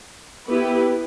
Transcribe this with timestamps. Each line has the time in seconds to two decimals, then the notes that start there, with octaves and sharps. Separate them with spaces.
0.49 B3 E4 G4 B4